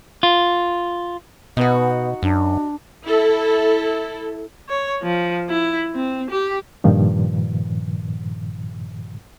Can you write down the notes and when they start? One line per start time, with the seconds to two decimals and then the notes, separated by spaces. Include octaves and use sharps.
0.23 F4
1.57 B2 B3 D#4 F#4
2.23 F#2 D4
3.05 E4 A4
4.69 C#5
5.03 F3
5.49 E4
5.95 C4
6.31 G4
6.84 G2 A#2 D#3 F3